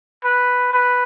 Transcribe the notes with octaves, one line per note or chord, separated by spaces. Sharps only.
B4
B4